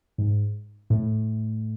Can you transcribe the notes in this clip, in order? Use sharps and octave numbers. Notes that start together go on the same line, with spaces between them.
G#2
A2